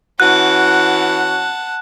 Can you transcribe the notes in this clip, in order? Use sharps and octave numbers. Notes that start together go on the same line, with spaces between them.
E3 C#4 F#4 F#5 A5 F#6